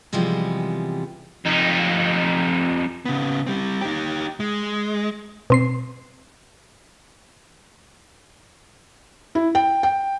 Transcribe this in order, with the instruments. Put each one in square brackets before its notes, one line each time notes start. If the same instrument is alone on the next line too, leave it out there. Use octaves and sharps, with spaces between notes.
[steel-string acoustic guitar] C3 E3 F3 G3 G#3 B3
[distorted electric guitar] F2 D#4
[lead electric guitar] C#3 B3
G3 C4
D#4 G4
G#3
[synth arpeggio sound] B2 C4 C7
[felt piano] E4
G5
G5